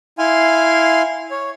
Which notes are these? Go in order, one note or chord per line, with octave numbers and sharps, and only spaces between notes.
E4 F5 G#5 C6
C#5